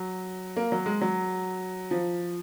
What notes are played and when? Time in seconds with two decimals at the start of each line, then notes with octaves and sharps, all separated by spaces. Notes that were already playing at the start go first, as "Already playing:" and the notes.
Already playing: F#3
0.57 A#3
0.72 F#3
0.86 G#3
1.01 F#3
1.91 F3